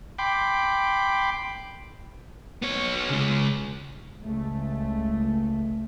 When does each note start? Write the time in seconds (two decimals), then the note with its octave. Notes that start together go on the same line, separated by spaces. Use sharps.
0.19 G5 B5 C6 D6
2.62 B3 C#5
3.09 C#3 G#3
4.23 C#2 A3